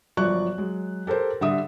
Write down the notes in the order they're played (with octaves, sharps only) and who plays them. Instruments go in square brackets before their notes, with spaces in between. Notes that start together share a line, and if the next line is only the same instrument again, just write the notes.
[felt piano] G1 F3 F#3 D5 C#6 F#6
F#3 G#3
G4 A4 A#4 C5
D3 G3 E5 D#6